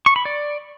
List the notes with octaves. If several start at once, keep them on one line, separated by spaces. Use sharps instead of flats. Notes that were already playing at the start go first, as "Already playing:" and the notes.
C#6
B5
D5